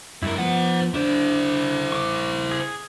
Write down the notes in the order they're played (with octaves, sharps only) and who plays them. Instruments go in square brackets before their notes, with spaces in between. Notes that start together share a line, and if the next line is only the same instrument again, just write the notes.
[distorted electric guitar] G2 A#4 [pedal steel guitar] E4
[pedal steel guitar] F3 B3 [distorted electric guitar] C5 F#5
[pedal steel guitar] D3 D4 [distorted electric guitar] E4 C5
[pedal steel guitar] C#6 D6
G#4